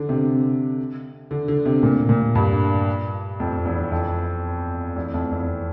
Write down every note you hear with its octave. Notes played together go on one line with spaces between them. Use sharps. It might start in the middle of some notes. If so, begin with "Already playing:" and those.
Already playing: D3
C3
D3
D3
C3
A#2
A#2
G2
F2
E2
F2
E2
F2
E2